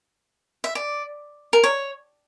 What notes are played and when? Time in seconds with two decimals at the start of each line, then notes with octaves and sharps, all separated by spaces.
0.64 E5
0.75 D5
1.53 A#4
1.63 C#5